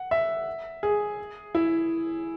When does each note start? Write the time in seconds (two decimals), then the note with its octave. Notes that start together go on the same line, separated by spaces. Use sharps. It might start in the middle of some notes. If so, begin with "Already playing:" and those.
Already playing: F#5
0.11 E5
0.83 G#4
1.55 E4